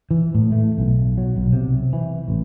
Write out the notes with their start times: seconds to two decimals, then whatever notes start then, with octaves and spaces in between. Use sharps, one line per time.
0.11 E3
0.35 A2
0.52 A3
0.78 B1
1.18 F#3
1.36 B1
1.53 C3
1.93 E3
2.28 A1